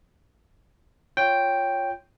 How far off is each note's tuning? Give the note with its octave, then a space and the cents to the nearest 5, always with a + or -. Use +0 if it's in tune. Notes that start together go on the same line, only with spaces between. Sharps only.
F4 +0 C#5 +0 G5 +0